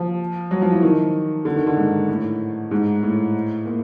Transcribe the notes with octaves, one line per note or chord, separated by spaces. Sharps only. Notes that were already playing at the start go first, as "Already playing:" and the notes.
Already playing: F3
F#3
F3
E3
D#3
D3
D#3
D3
G#2
A2
G#2
A2
A#2